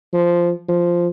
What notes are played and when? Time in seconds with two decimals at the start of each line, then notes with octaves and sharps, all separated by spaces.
0.13 F3
0.69 F3